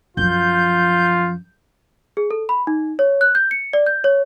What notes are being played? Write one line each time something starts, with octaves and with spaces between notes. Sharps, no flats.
F#2 F3 F4 G6
G#4
A4
B5
D#4
C#5
F#6
G6
C#7
D5
G6
C#5